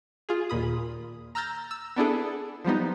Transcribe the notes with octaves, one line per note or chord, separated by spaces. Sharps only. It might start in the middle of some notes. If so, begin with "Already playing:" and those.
F4 G#4
D#2 A#2 B5 D#6
A#5 E6 F6 G6 A6 A#6
E6
B3 D4 E4 G#4 A4
F3 G3 B3 D#4